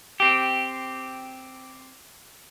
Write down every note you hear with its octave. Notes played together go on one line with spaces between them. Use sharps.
C4 G4